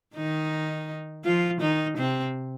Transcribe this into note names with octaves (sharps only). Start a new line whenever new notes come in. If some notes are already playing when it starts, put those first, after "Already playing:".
D#3 D#4
F3 F4
D#3 D#4
C3 C4